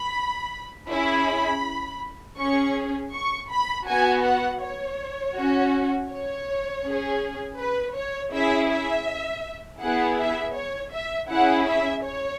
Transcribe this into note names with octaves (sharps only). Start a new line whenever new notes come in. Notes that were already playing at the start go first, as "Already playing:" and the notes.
Already playing: B5
C#4 E4 G#4 B5
C#4 G#4 C#6
C#6
B5
B3 F#4 G#5
F#5
C#5
C#4 F#4
C#5
C#4 G#4
B4
C#5
C#4 E4 G#4 E5
E5
B3 E4 G#4 F#5
E5
C#5
E5
C#4 E4 G#4 F#5
E5
C#5